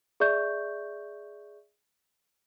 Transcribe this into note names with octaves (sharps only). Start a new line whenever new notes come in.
G#4 D5 E5 C#6 G6